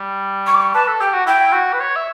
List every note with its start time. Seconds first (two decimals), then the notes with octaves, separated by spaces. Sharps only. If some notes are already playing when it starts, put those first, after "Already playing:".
Already playing: G3
0.46 C#6
0.54 D6
0.61 C#6
0.74 B4 A5
0.88 A4
1.00 G4 G5
1.13 F#4
1.26 E4 G5
1.47 E4
1.53 F#4
1.73 B4
1.80 C#5
1.96 E5